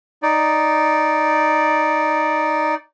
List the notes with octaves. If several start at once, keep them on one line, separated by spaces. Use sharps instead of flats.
D#4 D5